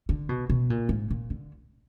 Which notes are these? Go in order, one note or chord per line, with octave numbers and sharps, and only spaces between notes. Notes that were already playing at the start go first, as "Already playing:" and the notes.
D3
B2
B2
A#2
G#2
A#2
D3